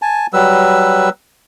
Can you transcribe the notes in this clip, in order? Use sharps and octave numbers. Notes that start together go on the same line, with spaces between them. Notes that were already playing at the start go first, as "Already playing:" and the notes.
G#5 A5
F#3 G3 B4 E6